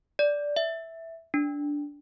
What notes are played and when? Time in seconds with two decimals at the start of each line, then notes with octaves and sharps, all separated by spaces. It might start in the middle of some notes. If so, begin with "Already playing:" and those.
0.19 D5
0.56 E5
1.34 D4